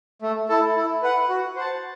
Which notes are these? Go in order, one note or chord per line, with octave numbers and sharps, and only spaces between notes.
A3
E4 A4
E4
B4 F#5
F#4
C5 F#5 A5